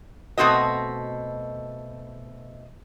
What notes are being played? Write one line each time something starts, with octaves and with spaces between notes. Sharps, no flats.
B2 A3 C4 F#4 D#5